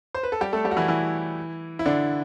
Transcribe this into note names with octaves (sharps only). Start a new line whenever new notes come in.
C5
B4
A4
G3 G4
A3 A4
G3 G4
F#4
E3 E4
E3 E4
E4
D3 D4